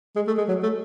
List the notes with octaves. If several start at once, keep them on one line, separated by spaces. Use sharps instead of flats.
G#3
A3
G#3
F#3
A3